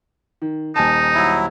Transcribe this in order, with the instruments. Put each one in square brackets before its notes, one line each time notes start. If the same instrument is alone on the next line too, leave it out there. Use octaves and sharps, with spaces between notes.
[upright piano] D#3
[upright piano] D#1 G#5 A5 [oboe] D#4
[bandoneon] F#3 E4